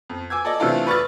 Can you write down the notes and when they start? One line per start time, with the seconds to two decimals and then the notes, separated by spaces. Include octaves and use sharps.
0.10 F2
0.30 G#5 D6 E6 G#6
0.45 A4 D5 D#5
0.60 C3 E3 A3 D4 F4 A4
0.87 B4 D5 C#6 E6 F6 A6